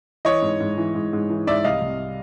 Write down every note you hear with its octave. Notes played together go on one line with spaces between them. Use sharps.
E3 C#5 D#5
G#2
G#2
E3
G#2
G#2
E3
G#2 D5 E5
C2 D#5 F5
C2